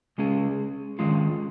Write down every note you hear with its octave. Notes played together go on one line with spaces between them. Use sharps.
C#3 G#3 C#4 G#4
D#3 G#3 C#4 F4